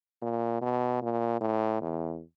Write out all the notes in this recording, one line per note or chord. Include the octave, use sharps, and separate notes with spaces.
A#2
B2
A#2
A2
E2